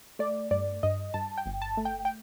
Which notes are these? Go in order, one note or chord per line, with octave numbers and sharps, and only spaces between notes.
A3 D5
G2 D5
G2 D#5
G2 A5
G5
G1
A5
A3
G5
G5